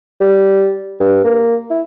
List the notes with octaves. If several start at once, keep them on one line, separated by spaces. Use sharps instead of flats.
G3
G2
A#3
E4